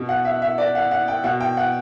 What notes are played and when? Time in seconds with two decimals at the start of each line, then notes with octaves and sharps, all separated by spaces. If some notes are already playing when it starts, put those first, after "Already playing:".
Already playing: B2
0.09 F#5
0.25 E5
0.42 E5
0.58 D5
0.75 F#5
0.91 F#5
1.08 G5
1.24 B2 F#5
1.41 G5
1.57 F#5